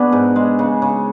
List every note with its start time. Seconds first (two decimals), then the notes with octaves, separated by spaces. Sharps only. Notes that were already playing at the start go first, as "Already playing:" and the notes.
Already playing: B2 B3 D4 F#4 G#4 B4
0.12 G#2
0.36 G#3
0.59 C#3
0.82 C#3